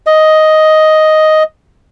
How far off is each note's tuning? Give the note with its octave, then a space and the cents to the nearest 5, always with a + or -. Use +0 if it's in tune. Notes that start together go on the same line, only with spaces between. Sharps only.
D#5 +5